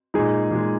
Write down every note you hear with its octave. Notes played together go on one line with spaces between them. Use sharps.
A#2 G#3 D#4 G#4
A#2 G#3